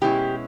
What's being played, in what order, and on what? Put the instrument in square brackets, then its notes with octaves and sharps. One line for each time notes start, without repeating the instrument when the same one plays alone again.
[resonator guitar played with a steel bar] B2 G#3 C#4 E4 G4